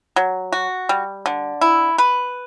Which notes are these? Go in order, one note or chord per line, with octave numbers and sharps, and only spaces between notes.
F#3
F#4
G3
D3
E4
B4